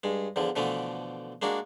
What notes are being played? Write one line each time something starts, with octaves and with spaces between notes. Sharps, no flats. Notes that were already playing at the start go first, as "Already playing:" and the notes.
G2 G#3
E2 D3 F3
B2 D3 E3 F3 A3
G#3 A#3 D4 F#4